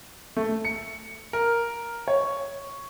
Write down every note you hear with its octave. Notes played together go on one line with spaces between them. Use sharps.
A3
C#7
A#4
C#5